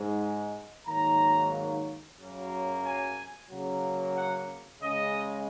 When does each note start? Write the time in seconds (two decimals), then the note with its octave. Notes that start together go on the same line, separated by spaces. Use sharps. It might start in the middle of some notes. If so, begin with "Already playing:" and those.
Already playing: G#2 G#3
0.86 G#2 D#3 F#3 A#3 A#5
2.18 F#2 C#3 F#3 A#3
2.84 G#5
3.50 C#3 F#3 A#3
4.16 F#5
4.81 C#3 G#3 D#5